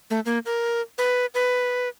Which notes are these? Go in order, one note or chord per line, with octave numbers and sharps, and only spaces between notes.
A3
A#3
A#4
B4
B4